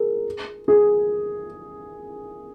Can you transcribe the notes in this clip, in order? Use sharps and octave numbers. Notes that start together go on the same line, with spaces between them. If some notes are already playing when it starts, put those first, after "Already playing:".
Already playing: G#4 A#4
G#4